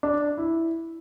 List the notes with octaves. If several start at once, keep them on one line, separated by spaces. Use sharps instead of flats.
D4
E4